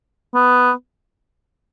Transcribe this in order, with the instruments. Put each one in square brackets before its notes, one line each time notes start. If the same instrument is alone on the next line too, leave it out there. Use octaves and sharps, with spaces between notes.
[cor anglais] B3